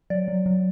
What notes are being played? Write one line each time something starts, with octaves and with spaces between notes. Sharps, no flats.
F#3 D5
F#3
F#3